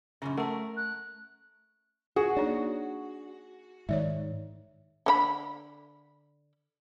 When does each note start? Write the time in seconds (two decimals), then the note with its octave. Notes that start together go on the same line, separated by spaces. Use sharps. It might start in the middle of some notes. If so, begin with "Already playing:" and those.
0.22 F#2 A#2 C#3 C#4
0.37 A3 A#4 F#5 A5
0.77 F#6
2.16 F#4 G#4
2.37 A#3 D4 D#4 C#5
3.89 G#2 D#3 C#5 D5 E5
5.06 D3 C#4 B5